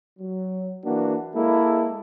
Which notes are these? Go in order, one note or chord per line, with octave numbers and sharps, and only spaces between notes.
F#3
E3 A#3 D4 F#4
G#3 A#3 E4 A4